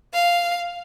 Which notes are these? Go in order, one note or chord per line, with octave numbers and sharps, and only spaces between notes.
F5